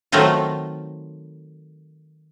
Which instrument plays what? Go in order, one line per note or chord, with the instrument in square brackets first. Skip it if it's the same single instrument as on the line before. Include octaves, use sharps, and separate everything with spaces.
[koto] D#3 F#3 A3 C4 D#4 F4